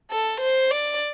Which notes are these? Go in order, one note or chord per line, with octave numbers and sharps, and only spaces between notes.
A4
C5
D5